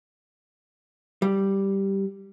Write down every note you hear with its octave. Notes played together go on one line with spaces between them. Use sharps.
G3